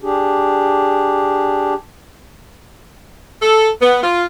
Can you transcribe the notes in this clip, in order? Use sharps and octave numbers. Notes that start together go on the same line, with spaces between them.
D4 G4 G#4
A4
B3
F4